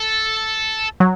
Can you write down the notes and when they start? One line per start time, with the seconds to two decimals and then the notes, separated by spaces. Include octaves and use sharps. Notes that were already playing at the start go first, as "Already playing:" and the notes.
Already playing: A4
1.00 F#3